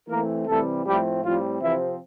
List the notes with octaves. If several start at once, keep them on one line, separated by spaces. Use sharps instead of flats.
E3 A3 A#3 C4 A#4
C3 E3 G3 A3 C4 A4
A2 F3 G3 A3 C4 G4
A2 F3 G3 C4 F4
C3 E3 F3 C4 E4